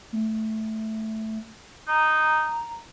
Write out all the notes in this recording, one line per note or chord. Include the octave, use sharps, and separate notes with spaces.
A3
D#4 A#5